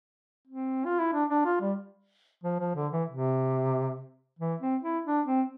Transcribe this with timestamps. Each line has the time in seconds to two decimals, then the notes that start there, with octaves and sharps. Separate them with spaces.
0.47 C4
0.85 F4
0.99 E4
1.13 D4
1.30 D4
1.45 F4
1.61 G3
2.44 F3
2.59 F3
2.76 D3
2.92 E3
3.09 C3
4.39 E3
4.61 C4
4.83 E4
5.05 D4
5.26 C4